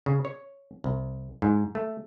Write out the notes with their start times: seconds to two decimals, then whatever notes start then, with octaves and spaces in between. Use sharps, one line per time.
0.06 C#3
0.25 C#5
0.84 C2
1.42 G#2
1.75 A3